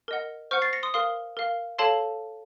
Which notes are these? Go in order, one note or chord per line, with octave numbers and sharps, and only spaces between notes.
A#4 D#5 F#5
C5 F#5 C#6 F6
A6 C7
A#6 C#7
C6 D#6
A#4 F5 C6 D#6
A#4 F5
A4 C#5 F5 A5 C6